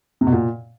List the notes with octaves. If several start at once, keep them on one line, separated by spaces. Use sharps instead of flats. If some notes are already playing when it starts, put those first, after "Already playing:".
C3
B2
A#2